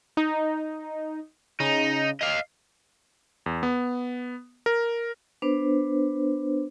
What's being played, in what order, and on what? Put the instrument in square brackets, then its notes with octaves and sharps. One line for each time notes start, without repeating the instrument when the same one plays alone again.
[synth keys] D#4
[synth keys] C#3 [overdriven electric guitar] D#4
[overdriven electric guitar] D#5 F5
[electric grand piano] E2
B3
A#4
[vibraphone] B3 D4 B4 C5